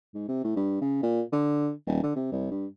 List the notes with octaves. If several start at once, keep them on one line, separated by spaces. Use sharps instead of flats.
G#2
C3
A2
G2
C#3
A#2
D3
D#1
D3
C3
C2
G2